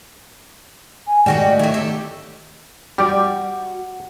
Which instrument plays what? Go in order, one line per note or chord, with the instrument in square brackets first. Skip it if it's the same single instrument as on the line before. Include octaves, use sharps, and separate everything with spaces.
[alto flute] G#5
[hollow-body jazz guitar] G#2 D#3 A3 [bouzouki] G3 F#4 G4 [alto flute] G5
[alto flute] D#5
[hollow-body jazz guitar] D#3 A3 [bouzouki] F#3 E4
[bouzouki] G4 A4
[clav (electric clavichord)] G3 G4 D5 [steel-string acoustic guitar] F#4